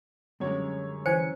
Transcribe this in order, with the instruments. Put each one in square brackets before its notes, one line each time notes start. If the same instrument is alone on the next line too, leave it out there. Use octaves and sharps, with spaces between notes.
[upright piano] F#2 C#5 [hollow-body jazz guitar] D3 G3 G#3
[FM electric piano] E3 G#5 C#7 [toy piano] C5